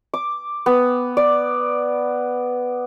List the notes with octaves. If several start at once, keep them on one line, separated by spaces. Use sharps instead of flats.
D6
B3
D5